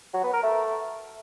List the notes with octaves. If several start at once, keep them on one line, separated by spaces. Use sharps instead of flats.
F#3
B3
A#4
A3